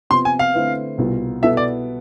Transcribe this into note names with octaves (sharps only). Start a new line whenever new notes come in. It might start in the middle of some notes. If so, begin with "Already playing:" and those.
C3 F3 B3 C6
G#5
F5
D3 A3 C4 E4 B4
C2 B2 B3 F4
B2 B3 E4 A4 E5
D5